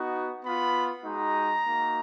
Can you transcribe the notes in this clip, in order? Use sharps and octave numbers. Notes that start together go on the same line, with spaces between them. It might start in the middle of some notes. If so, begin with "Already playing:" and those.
Already playing: B3 D#4 F#4
B3 F4 B5
G#3 D#4 F#4 A#5
A#3 D#4 F#4